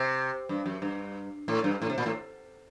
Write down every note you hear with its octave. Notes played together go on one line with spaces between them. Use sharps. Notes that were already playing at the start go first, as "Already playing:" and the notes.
Already playing: C3
G2
F#2
G2
A2
G2
A2
C3
A#2
A2